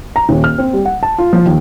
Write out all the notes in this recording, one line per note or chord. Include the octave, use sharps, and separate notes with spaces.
A#5
D#1
F6
C4
G3
F#5
A5
F4
F3
D#2